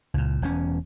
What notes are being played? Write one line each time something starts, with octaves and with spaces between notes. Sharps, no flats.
C#2 A#2
E1 E2 C#4